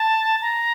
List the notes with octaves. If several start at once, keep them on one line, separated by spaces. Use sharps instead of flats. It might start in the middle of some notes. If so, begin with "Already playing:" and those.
Already playing: A5
A#5